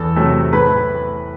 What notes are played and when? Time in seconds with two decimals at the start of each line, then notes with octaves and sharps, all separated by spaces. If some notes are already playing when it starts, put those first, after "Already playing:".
Already playing: E2 A4 A5
0.16 C3 F#3 A3
0.53 A2 B4 B5